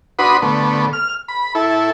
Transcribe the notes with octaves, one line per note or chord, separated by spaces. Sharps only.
D4 F#4 B4 B5 C6 D#6
D3 A3 B3
F6
B5
E4 A4